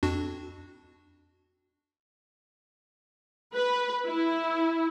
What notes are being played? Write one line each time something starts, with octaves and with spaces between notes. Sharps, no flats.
F2 D4 F#4
B4
E4